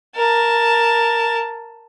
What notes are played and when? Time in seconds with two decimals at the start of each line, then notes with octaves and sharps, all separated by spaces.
0.16 A#4 A5